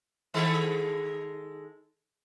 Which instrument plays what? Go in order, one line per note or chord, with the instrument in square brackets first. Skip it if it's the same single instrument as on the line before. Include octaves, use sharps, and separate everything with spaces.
[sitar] D#3 G#3 A4